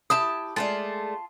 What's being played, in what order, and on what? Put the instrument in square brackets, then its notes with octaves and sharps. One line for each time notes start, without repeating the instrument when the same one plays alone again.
[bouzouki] E4 G4 A5 [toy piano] D#6
[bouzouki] G#3 A3 D5 [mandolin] F4 A5